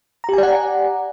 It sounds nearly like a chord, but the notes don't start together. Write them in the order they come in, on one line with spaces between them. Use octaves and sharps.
A#5 G4 G#5 D5 F#5